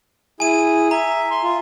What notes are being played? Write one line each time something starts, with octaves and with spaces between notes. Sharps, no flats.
E4 G#4 G#5 D#7
E5 A#5
C6
F4